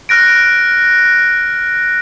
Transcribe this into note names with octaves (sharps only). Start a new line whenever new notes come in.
F6 F#6 A#6 D7